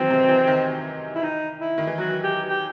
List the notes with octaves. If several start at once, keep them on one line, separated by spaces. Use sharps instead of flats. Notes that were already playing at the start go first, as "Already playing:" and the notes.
Already playing: D#3 E3 F#3 C4
C3
E3
D#3
E4
D#4
E4
D#3
E3
F#3 F#4
G4
G4